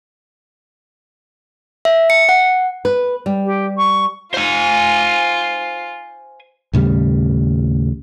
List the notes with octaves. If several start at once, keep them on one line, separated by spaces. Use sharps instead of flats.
E5
C#7
F#5
B4
G3
G4
C#6
F4 C5 G#5
D#2 A2 C#3 G3